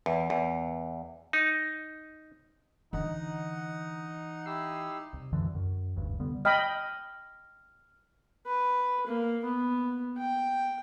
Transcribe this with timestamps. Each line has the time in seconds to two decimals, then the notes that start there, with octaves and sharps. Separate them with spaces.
0.06 E2
0.30 E2
1.33 D#4
2.93 D3 E3 D#4 D#5 F#5 A#5
4.46 E4 G4 E6 C7
5.13 C2
5.33 C2 F#2 D3 E3
5.55 F#2
5.96 F1 D2 G2
6.20 C#2 D3 G3 B3
6.45 D#5 G5 B5 F6
8.46 B4
9.07 A#3
9.44 B3
10.18 G5